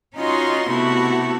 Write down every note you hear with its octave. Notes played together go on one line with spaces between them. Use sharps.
C#4 D#4 F4 F#4 D#5 C6
C3 A3 B3 E4 F#4